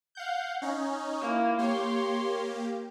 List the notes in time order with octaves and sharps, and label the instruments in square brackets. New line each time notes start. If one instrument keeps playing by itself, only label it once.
[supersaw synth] F5 F#5 G6
C#4 D#4
[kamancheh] A#3 E4
[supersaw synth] A#3 G4 [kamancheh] C#5 C6